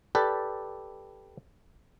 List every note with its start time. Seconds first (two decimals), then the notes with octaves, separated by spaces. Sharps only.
0.15 G4 A4 B4 D5